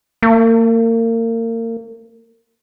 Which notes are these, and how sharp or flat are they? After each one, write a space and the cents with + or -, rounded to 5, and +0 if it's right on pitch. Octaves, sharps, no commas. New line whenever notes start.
A#3 -35